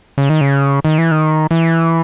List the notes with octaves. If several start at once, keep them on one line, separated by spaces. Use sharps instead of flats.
C#3
D#3
C#3
D#3
E3
D#3
E3